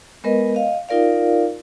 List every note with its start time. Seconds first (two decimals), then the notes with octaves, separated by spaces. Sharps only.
0.24 G#3 B3 A#4 B4 D#5
0.55 D#5 F5
0.89 D#4 F4 A#4 D5 F5